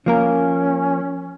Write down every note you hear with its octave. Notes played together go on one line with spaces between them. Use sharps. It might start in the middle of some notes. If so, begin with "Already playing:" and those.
F3 A#3 C#4 A#4